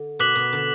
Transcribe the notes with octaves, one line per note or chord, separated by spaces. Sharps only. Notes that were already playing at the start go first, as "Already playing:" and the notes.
Already playing: D3
B2 D6 F#6 B6 F#7
B2
D3